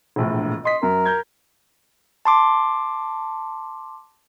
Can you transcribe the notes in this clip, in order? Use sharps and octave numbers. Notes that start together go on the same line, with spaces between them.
E1 A#1 A2
D#5 C6 B6
F#2 A#4
A#5 G6 G#6
A5 C6 D6